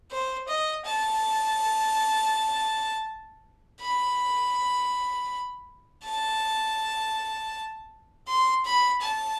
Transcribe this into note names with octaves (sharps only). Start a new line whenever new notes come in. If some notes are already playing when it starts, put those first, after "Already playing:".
C5
D#5
A5
B5
A5
C6
B5
A5